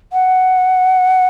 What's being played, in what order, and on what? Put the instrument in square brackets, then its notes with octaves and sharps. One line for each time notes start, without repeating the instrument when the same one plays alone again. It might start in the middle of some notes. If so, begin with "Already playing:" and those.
[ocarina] F#5